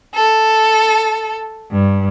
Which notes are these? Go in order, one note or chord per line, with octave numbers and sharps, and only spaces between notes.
A4
G2